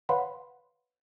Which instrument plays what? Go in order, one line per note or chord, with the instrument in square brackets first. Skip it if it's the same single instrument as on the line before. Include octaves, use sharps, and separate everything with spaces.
[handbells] B4 C#5 F5 F#5 B5 C6